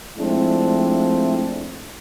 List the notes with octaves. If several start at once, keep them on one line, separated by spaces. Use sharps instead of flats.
F3 G#3 A3 C4 D4 E4